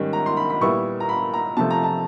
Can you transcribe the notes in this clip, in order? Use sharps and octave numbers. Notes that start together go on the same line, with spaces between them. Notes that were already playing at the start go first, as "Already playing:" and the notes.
Already playing: G#2 D#3 G3 C#4
A#5
C6
B5
B5
A#2 G3 B3 E4 C#6
A#5
B5
A#5
C3 F3 A3 A5
A#5
A5